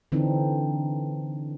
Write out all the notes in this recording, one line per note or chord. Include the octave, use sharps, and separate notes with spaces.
D3 E3 C4 D4 D#4